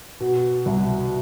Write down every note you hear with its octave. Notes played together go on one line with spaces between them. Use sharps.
B2
C2